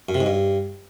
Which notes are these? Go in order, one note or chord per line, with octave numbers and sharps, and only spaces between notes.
F#2
C3
G#2
G2